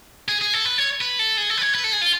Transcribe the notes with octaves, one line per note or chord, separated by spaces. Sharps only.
G#4
G#4
A4
B4
C#5
B4
A4
G#4
A4
B4
C#5
B4
A4
G#4
F4